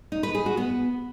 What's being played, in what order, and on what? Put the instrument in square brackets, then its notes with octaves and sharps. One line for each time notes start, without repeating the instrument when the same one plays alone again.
[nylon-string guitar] D#4
B4
G#4
F#4
B3